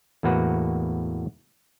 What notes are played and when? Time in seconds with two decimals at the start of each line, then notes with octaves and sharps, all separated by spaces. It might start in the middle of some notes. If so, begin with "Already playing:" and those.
0.23 E2 A2 A#3 F#4 B4